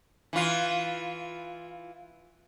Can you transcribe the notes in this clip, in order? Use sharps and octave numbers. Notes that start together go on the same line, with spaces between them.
E3 F4